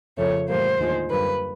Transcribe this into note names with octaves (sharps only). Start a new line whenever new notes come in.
F2 C#3 F3 A3 C#5
A2 E3 G3 A#3 C5
D#2 D3 F3 G#3
F#2 D3 G3 A#3 B4